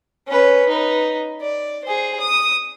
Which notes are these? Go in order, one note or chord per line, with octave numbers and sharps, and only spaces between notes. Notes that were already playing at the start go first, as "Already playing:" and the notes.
C#4 B4
D#4 B4
D5
G#4 C5
D#6